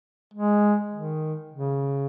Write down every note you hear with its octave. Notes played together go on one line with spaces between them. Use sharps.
G#3
D#3
C#3